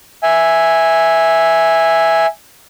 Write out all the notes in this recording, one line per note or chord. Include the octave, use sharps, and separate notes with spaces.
E5 G#5